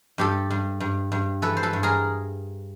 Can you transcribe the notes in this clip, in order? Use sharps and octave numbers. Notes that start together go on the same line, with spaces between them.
G2 G4 A4
G2
G2
G2
E3 A4 B4
C5
A4 B4
G2
G#4 A#4